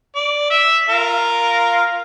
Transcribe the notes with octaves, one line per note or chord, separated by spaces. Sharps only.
D5
E5
F4 A#4 F5